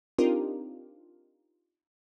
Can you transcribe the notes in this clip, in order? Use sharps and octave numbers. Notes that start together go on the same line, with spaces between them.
C4 D4 D#4 F4 G4 A#4